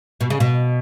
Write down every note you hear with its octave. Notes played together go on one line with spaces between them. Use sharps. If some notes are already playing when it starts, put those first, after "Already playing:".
B2
C#3
B2